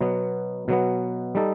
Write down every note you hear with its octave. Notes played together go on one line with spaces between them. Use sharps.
B2 F#3 B3
B2 F#3 B3
G3 D#4 A4